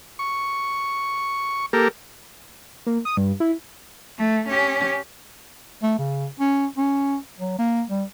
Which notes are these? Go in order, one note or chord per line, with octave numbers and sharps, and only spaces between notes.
C#6
A#3 G4 A4 A#4
A#3
D#6
G2
E4
A3
C#4 G4
A3
C#3
C#4
C#4
F#3
A#3
G3